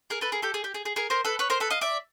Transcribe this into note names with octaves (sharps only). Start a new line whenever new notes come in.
G#4 A#4
A4 B4
G#4 A#4
G4 A4
G#4
G4
G#4
G#4
G#4 A#4
A#4 C5
A4 B4
B4 C#5
A#4 C5
A4 B4
D#5 F5
D5 E5